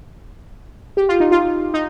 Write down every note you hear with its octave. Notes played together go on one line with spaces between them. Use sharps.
G4
F4
D#4
F4
D#4